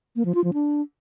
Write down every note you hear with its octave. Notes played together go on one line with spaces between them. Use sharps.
A#3
F3
F4
F3
D4